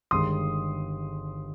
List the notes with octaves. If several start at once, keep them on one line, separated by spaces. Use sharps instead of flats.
G1 G2 D#3 G#3 C6 D#6